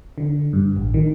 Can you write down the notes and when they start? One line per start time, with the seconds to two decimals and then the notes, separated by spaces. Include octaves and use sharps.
0.18 D3
0.53 G2
0.76 A1
0.94 D#3